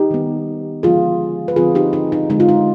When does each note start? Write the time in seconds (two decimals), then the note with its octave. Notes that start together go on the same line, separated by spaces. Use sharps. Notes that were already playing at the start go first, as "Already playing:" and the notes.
Already playing: D#4 G4
0.11 D#3 G3 B3
0.83 D3 F3 G#3 B3 F4 G#4
1.48 B4
1.56 D3 F3 C4 F4 G#4
1.75 D#4 G4
1.93 D#4
2.12 D#4
2.30 D3 G#3 C4 D#4
2.40 F4
2.49 D#4